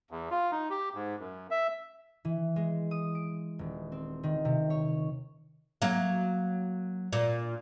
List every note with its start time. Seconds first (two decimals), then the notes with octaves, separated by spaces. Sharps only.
0.11 E2
0.31 F4
0.52 D#4
0.70 G4
0.94 G#2
1.19 F#2
1.51 E5
2.25 E3
2.56 G#3
2.91 D#6
3.15 D7
3.59 D#1
3.92 C4
4.23 D#3
4.45 C3
4.70 C#5
5.82 F#3 A#3
7.13 A#2